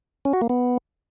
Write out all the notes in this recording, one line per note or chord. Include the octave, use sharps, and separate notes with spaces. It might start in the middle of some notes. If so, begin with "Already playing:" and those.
C#4
F#4
A#3
B3